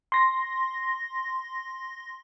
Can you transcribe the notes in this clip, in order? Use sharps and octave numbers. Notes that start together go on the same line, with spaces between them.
C6 A#6